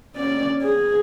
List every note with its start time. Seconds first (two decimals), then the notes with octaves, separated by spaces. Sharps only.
0.16 C#4 D5
0.62 G#4